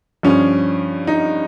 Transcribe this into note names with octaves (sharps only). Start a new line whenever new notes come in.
G2 F3 C#4
D#4